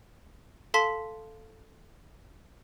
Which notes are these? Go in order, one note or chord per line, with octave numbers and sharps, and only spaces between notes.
A4 F5 A5 C6 B6